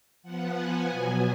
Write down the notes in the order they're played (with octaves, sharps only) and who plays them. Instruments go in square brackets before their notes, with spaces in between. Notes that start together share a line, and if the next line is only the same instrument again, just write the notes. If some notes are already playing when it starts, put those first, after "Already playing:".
[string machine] F3 B3 F#5
G#5
B2 F#3 B3